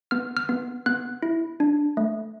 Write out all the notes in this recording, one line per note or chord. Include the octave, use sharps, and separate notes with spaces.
B3 F6
F6
B3
B3 F#6
E4
D4
A3